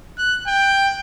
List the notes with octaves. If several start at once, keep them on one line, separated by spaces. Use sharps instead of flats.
F#6
G5